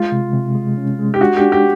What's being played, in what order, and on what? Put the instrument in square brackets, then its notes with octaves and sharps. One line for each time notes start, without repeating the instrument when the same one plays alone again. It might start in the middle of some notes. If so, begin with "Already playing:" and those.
Already playing: [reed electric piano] G#3 [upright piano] F4
[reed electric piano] C3
C3
G#3
C#4
G#3
[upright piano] G4
[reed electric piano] D4 [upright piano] F#4
[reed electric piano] D4 [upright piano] G4
[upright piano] G4